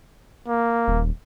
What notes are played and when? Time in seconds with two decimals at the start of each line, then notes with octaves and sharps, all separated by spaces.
0.48 A#3
0.88 D#1